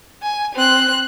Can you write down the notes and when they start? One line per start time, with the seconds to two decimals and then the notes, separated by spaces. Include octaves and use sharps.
0.23 G#5
0.55 C4 F#6